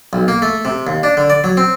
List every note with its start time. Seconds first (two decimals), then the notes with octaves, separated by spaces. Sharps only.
0.13 B1
0.28 A#3
0.42 A3
0.65 C3
0.87 D#2
1.03 D4
1.17 D3
1.30 D5
1.44 F#3
1.57 C4